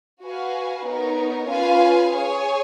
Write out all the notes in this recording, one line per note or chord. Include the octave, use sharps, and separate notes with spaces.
F#4 B4 F5 G#5
B3 D#4 A#4 C#5
C#4 F4 B4 F5 G#5
G#4 C#5 G#5